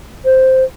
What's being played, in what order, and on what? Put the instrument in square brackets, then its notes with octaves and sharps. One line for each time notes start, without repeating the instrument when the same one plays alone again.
[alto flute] C5